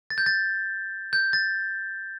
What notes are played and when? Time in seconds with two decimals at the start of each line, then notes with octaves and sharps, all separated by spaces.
0.10 A6
0.18 G6
0.26 A6
1.13 G6
1.33 A6